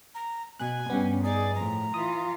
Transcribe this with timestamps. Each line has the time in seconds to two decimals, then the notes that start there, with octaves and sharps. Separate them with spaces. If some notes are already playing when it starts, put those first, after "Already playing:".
0.14 A#5
0.60 B2 G#5 F#6
0.90 G2 G3 B3 C#4
1.24 D#4 G#4 D5
1.55 A2 F3 A#5
1.94 E3 F4 D#6